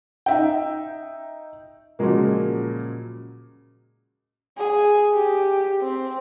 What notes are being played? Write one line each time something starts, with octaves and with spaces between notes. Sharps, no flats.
D#4 E5 G5
A#2 C#3 F3 F#3 G#3 A#3
G#4
G4
C4